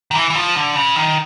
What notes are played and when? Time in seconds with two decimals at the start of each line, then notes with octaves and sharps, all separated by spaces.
0.11 D#3
0.15 E3
0.30 E3
0.35 F3
0.56 D3
0.75 C#3
0.96 D#3